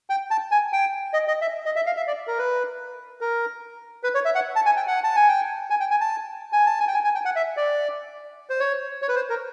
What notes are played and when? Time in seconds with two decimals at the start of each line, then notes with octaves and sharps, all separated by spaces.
0.10 G5
0.31 A5
0.51 G#5
0.73 G5
1.13 D#5
1.28 D#5
1.41 E5
1.66 D#5
1.76 E5
1.86 F5
1.97 E5
2.07 D5
2.27 A#4
2.38 B4
3.21 A#4
4.03 B4
4.15 C#5
4.25 E5
4.35 F#5
4.56 A5
4.66 G#5
4.77 G5
4.87 F#5
5.04 A5
5.16 G#5
5.28 G5
5.70 G#5
5.80 G5
5.91 G#5
6.01 A5
6.53 G#5
6.66 A5
6.80 G#5
6.88 G5
6.94 G#5
7.04 G#5
7.15 G5
7.25 F#5
7.36 E5
7.57 D5
8.50 C5
8.60 C#5
9.02 C#5
9.09 B4
9.16 C5
9.30 A#4